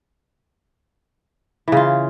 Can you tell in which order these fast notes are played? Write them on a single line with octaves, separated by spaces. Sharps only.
E3 C#3 F4